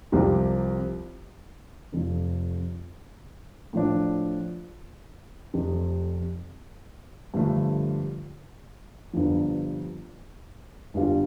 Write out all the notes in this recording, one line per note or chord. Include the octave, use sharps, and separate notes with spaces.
C2 C3 F3 C4 G4
F1 F2 F3
A2 F3 D4
F1 F2 C3
G2 D3 F3 A3
G1 G2 F3
G1 G2 G3 F4